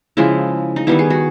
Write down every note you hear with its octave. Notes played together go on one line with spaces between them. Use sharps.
C#3 F3 G#3 E4
D#4
D#3 G3 B3 E4
G#4
F#4